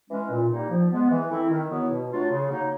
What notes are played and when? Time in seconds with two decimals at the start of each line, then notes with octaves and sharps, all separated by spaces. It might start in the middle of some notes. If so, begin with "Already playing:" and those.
0.10 E3 G#3 C#4
0.30 A#2
0.50 G3 A#3 D#4
0.70 F3
0.90 G#3 B3
1.10 E3
1.30 A3 C4 E4
1.50 D#3
1.70 F#3 B3 E4
1.90 B2
2.10 F#3 A3 D4 F4
2.30 C#3
2.50 F#3 A#3 D#4